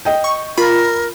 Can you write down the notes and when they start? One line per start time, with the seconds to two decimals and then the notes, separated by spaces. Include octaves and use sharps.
0.05 D#5 G5
0.24 C#6
0.58 F4 A#4 B5